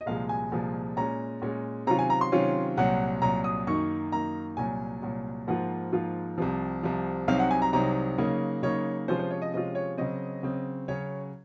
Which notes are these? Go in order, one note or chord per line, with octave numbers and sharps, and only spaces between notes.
D#5
C2 A#2 F3 G#3 F5
G#5
C2 A#2 F3 G#3
A#2 G#3 C#4 A#5
A#2 G#3 C#4
C3 D#3 F#3 C#4 F4 A#5
G#5
A#5
C6
C3 D#3 F#3 C#4 F4
C2 A#2 F#3 F#5
C2 A#2 F#3 A#5
D#6
F#2 D#3 A#3 D#4 C#6
F#2 D#3 A#3 D#4 A#5
C2 A#2 F#3 G#5
C2 A#2 F#3
G#2 F3 A#3 F4 F#5
G#2 F3 A#3 F4
C2 C3 F3
C2 C3 F3
C2 C3 F#3 C4 D#4 F5
F#5
G#5
A#5
C2 C3 F#3 C4 D#4 A#5
C#3 F#3 A#3 D#4
C#3 F#3 A#3 D#4 C#5
C3 F3 G#3 C#4 F4 C5
C5
C#5
D#5
C3 F3 G#3 C#4 F4 D#5
C#5
C#3 F#3 C4 D#5
C#3 F#3 C4
C#3 F#3 C#4 C#5